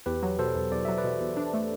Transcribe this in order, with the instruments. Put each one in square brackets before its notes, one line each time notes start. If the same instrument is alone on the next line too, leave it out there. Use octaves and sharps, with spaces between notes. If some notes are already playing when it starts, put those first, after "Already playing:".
[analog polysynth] E2 [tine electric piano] G4 B4
[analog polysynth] F#3
[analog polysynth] B2 [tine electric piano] A4 C5
[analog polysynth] E2
[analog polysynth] E2 [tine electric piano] D5
[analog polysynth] F#3 [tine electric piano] E5
[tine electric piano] B4 D5
[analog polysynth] B2
E2
D4
A3